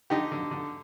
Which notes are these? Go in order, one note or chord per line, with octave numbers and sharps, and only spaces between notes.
D3 D#4 G4
D3
D3